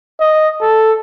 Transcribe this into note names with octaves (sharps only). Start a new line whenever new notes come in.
D#5
A4